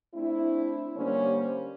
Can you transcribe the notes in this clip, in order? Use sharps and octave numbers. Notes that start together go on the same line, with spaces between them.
A3 C4 D4 E4
D3 G3 A#3 C#4 C5 C#5